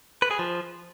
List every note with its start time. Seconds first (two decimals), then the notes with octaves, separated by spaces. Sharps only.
0.22 B4
0.31 G#4
0.39 F3